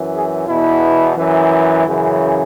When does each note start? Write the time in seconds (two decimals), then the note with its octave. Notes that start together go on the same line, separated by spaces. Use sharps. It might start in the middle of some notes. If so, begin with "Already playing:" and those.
Already playing: F#2 E3
0.13 G#4
0.47 E2 B2 E4
1.16 F#2 E3
1.85 F#2 C#3 E3